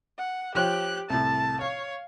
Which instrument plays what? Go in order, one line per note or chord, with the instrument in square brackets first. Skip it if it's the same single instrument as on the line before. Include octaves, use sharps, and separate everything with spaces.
[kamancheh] F#5
[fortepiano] F3 C#5 G5 [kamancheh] G4 F#6
[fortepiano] C2 A2 [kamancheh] A5
[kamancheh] C#5 [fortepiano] F5